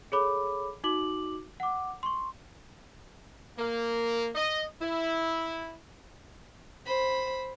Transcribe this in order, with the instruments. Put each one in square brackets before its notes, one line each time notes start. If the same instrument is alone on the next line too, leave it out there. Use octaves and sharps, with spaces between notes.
[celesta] G#4 A4 C#5 B5 D6
D#4 F#4 D6 F#7
F#5 D6
C6 C#6
[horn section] A#3
D#5
E4
[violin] C5 B5